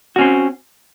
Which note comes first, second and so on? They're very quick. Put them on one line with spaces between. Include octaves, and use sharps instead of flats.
F#4 C#4 C4